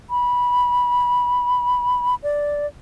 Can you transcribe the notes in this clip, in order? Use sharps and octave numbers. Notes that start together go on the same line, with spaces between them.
B5
D5